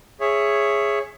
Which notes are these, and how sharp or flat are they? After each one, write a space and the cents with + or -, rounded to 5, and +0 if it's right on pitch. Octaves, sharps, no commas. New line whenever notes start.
G#4 +0 C#5 +0 E5 +15